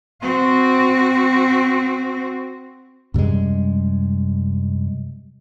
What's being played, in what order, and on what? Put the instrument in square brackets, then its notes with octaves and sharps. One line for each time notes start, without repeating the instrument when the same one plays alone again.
[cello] C4 F#4
[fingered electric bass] F#2 C3 G3 G#3